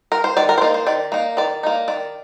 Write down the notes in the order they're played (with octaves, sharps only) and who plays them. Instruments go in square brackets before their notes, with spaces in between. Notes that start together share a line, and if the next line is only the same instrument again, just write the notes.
[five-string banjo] A#4
C5
D#3 D5
A#4
C5
A#3 D#4 D5
C5
D#3 D5
A#3 D#4
D#3 D5
A#3 D#4
D#3 D5